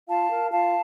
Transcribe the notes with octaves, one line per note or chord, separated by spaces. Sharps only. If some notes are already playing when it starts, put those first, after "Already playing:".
F4 F5 A5
A#4
F4 F5 A5